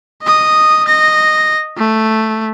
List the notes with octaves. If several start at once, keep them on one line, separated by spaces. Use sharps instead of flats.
D#5 D#6
D#5 A#6
A3